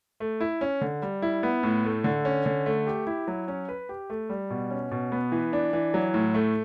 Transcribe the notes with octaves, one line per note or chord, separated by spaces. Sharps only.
A3
E4
C#4
D3
G3
E4
B3
A2
A3
D3
C#4
D3
A3
G4
E4
F#3
C#4
B4
G4
A3
G3
B2
C#4
B2
B3
E3
D4
E3
F#3
A2
A3